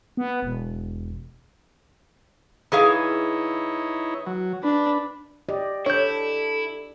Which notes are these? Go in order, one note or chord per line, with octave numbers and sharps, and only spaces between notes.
B3
E1
E3 D#4 E4 G#4 C#5 F5
F#3
D4 B4
G4 D5 D#5
D4 E4 A4 C#5 G6